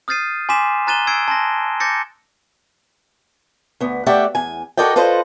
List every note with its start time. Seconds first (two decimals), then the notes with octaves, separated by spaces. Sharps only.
0.08 D#6 F6 G6 A6 C7 D#7
0.49 G#5 C6 D6 B6 E7
0.87 A#5 F#6 A6 D#7 E7 G7
1.07 E6 G#6 C7 D7
1.28 A5 C6 A#6
1.80 D6 G6 A6 A#6 C#7
3.80 D2 B3
4.06 A3 G4 D5 E5 F#5 G5
4.35 E2 G#5
4.77 F#4 A4 A#4 D5 D#5 G5
4.96 F4 A4 B4 C5 D#5